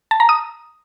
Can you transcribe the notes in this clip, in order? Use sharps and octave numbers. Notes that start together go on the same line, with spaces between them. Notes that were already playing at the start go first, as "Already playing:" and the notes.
A5
A#5
D#6